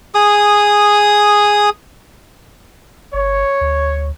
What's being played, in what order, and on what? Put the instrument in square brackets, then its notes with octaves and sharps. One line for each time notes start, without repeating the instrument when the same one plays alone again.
[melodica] G#4 D#6
[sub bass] G1 [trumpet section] C#5
[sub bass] D2